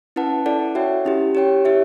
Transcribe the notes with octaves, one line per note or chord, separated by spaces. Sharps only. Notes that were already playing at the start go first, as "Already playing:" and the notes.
C#4 E4 B4 F#5 A5
E4 A4 D5 F#5
F#4 C#5 E5 G5
C#4 E4 G4
G4 C#5 G5
E4 G4 C#5 E5